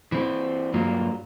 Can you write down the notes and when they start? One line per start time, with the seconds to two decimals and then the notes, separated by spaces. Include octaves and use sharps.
0.12 E3 C4
0.74 G2 F#3 A#3 F4